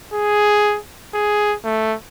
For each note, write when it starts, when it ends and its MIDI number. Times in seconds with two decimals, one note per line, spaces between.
0.13 0.78 68
1.14 1.54 68
1.64 1.95 57